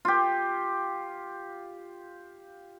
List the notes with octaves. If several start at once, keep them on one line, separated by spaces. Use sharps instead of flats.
F4 G4